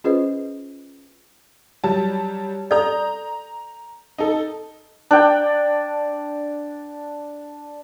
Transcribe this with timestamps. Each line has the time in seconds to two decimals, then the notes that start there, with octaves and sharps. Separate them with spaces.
0.04 C#4 F4 G#4 B4 C5 D#5
1.84 F#3 G3 A5
2.71 A4 D5 A#5 G6
4.18 D#4 A4
5.11 D4 G5